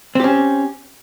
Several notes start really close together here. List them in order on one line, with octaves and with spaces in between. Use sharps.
C4 G4 C#4